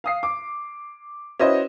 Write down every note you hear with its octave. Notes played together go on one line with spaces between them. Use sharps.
F5 D#6 C7
D6
C#4 E4 F#4 B4 C5 D#5